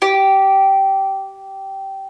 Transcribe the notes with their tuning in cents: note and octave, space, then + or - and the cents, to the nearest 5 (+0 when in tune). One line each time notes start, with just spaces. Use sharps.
G4 -15